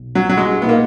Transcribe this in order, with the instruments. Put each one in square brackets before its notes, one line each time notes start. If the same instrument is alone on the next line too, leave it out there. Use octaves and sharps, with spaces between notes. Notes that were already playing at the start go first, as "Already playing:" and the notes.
Already playing: [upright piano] B1 B2
[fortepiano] F#3
F#3
G#3
[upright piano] A#2 G#3 D#4 [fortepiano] B3
[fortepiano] A#3